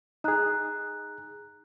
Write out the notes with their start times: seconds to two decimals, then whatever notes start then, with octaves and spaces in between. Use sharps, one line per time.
0.24 D#4 G#4 A#5 F#6